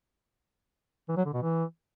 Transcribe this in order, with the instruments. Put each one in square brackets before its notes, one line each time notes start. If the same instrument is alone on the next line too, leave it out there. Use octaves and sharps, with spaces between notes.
[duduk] E3
F#3
D3
B2
E3